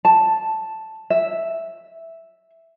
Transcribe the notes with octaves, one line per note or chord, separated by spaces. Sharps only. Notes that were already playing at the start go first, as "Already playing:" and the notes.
A5
E5